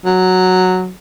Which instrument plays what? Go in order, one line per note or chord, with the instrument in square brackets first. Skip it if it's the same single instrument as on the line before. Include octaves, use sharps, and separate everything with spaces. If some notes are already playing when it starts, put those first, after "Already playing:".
[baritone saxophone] F#3